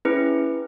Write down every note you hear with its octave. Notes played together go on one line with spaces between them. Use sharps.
C#4 E4 G#4 B4